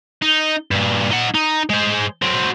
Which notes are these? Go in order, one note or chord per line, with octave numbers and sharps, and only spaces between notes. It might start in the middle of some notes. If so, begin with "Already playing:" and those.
D#4
G2 A#2
D#4 F#5
D#4
G#3 C5
F#3 C4